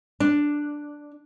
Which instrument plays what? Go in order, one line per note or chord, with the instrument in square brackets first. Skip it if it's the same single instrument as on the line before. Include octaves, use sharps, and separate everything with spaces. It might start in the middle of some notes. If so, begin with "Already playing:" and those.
[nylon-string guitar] D4